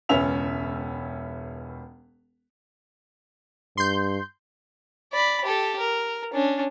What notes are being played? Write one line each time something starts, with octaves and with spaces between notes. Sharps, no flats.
E1 C#2 C#4 B4 E5 F7
G2 C6 G6
D5 B5
G4 A4
A#4
C#4 D4